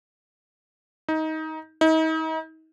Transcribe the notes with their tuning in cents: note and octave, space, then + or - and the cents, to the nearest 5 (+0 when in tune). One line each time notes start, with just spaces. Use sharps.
D#4 +20
D#4 +40